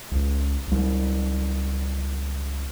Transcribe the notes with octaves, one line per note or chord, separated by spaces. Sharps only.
C#2
C#2 G3